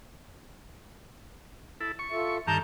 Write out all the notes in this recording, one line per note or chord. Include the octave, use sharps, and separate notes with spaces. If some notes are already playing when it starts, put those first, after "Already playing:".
E4 A4
C#6
F4 A4 E5
G2 D3 D#3 A5 A#5 G6